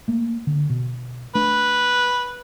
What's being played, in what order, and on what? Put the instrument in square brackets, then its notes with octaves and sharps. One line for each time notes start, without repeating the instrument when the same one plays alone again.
[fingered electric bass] A3 A#3
D3
B2
[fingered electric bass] A3 D4 [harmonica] B4